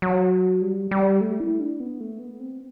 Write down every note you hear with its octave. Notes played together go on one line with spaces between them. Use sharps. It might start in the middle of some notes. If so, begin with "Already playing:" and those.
F#3
G3
G3
A3
E4
D4
B3
A3
B3
C4